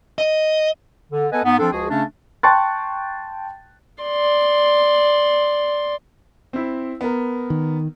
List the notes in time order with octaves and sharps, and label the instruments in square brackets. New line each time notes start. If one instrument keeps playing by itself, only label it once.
[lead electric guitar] D#5
[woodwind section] D3
B3 A4 B4 D#5 G#5
G#2 B3
F3 C4 D4 A4
C#2 F3 F#4 G#4
C#3 A3 C#4 D4
[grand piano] G5 A5 C6 C#6 F#6 A6
[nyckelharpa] D5 C6
[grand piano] C4 E4
B3 A#4
[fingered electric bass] D#3